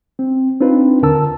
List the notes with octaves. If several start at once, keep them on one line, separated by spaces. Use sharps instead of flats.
C4
C4 D4 D#4 F4 B4
D#2 D3 A#4 A5 E6